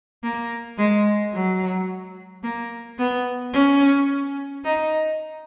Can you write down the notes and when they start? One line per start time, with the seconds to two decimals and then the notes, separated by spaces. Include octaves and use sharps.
0.24 A#3
0.78 G#3
1.34 F#3
2.44 A#3
2.99 B3
3.54 C#4
4.65 D#4